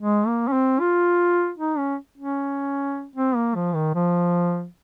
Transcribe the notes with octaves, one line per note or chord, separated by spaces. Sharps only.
G#3
A#3
C#4
C4
F4
D#4
C#4
C#4
C4
A#3
F3
D#3
F3